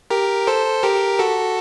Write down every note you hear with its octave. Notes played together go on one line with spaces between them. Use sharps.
G4 A#4
A4 C5
G4 A#4
F#4 A4